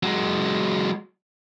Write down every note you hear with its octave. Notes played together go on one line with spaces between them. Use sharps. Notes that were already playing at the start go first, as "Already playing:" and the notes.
F#3 G#3